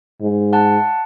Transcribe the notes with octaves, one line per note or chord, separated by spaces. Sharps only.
G#2
F#5 A5